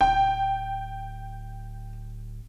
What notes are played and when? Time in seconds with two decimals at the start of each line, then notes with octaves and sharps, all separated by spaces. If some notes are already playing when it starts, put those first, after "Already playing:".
0.01 D1 G5